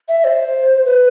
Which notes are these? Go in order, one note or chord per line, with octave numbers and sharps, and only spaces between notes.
E5
C5
B4